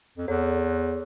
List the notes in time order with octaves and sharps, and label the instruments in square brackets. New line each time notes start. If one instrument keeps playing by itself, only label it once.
[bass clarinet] F2
[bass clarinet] E2 [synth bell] A4 C#5